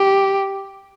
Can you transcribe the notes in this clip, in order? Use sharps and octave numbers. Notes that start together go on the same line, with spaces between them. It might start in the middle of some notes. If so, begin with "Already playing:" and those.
Already playing: G4